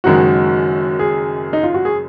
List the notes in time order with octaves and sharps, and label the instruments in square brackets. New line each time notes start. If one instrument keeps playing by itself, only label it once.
[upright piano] F#1 F#2 D#3 G#3 [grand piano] F#4
[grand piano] G#4
D#4
F4
F#4
G#4